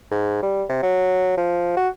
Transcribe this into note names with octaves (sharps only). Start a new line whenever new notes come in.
G#2
G3
C3
F#3
F3
F#4